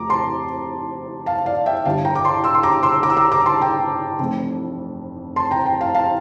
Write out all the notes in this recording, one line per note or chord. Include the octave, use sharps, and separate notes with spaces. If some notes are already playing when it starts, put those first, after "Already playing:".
Already playing: F2 C3 F3 A3 A#5 D6
A5 C6
F5 A5
D5 F5
E5 G5
G1 G2 E3 G3 F5 A5
G5 A#5
D6
A5 C6
C6 E6
C6
A#5 D6
C6 E6
A#5 D6
E6
A#5 D6
A#5 D6
A5 C6
G5 A#5
F1 F2 E3 A3
A5 C6
G5 A#5
G5 A#5
F5 A5
F5 A5